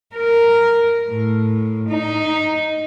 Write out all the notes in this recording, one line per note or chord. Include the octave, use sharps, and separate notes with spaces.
A#4
A2
D#4